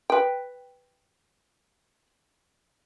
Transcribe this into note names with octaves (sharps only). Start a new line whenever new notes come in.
B4 G5